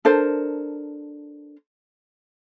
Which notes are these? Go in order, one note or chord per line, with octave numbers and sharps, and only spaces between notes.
D4 A4 A#4 C5